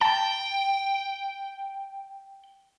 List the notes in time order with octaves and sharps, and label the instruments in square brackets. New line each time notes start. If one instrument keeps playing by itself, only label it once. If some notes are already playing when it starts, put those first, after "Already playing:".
[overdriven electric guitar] G5 [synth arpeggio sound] A5